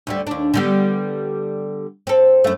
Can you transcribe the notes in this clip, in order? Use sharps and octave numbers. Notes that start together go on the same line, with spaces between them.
D2 D3 G3
D#2 D4
D3 G3 B3
C4 A4
F#2 A3